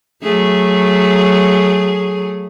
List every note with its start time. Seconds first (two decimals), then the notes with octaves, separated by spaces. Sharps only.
0.23 F#3 A3 G#4